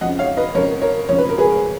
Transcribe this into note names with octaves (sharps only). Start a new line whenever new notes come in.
F2 C#3 D#5 F#5
C#5 F5
B4 D#5
F2 C#3 A#4 C#5
A#4 C#5
F2 C#3 C#5
B4
A#4
G#4 B4